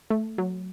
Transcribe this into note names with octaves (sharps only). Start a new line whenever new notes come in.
A3
F#3